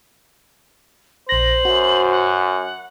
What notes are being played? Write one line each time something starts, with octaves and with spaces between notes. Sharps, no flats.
A#1 C5 A#6 F#7
F#2 F#4
F#5